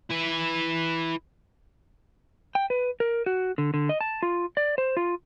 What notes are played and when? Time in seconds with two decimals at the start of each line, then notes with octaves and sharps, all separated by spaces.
0.11 E4 B4
2.55 G5
2.70 B4
3.00 A#4
3.26 F#4
3.58 D3
3.74 D3
3.89 D#5
4.01 A5
4.23 F4
4.57 D5
4.78 C5
4.97 F4